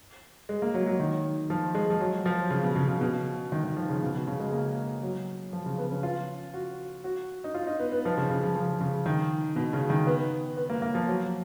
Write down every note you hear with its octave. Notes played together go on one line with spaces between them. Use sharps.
G#3
A#3
F#3
F#3
D#3
F3
G#3
F3
F#3
F3
C#3
B2
C#3
C#3
B2
D#3
D#3
F3
C#3
B2
B2
C#3
G#3
A#3
F#3
F3
C#3
B3
C#4
F4
F#4
F#4
D#4
F4
D#4
B3
B3
F3
C#3
C#3
F3
F3
C#3
D#3
B2
C#3
D#3
B3
B3
A#3
A#3
F3
F#3